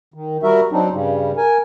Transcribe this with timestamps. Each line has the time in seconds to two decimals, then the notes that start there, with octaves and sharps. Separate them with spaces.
0.14 D#3
0.43 G3 F#4 A#4 E5
0.72 F#3 C4 D4 D#4
0.93 G2 C#3 G3
1.37 A#4 G#5